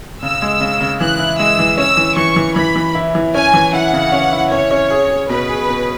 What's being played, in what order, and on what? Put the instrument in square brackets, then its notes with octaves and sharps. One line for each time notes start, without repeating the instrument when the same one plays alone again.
[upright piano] C#3 [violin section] E6
[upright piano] G#3
C#3
C#3
[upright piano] E3 [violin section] F#6
[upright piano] E4
[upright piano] G#3 [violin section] E6
[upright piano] E3
[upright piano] C#4 [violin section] E6
[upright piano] E3
[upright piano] E3 [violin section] C#6
[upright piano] E3
[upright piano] E3 [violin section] B5
[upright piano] E3
E4
E3
[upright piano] C#4 [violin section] G#5
[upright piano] E3
[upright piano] E4 [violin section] F#5
[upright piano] C#3
C#4
E4
[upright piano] C#4 [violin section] C#5
[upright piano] C#4
G#4
G#4
[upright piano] B2 [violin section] B4
[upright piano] G#4
B2